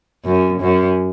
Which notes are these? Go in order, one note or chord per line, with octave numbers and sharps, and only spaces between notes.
F#2
F#2